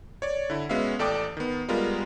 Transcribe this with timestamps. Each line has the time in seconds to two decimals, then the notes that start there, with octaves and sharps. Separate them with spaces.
0.22 C#5 D5
0.50 D3 E4
0.69 G#3 B3 C#4 F#4 E5 F5
0.99 A1 A4 D5 G5 D6 D#6
1.37 D#3 B3
1.68 G3 G#3 B3 F4 A#4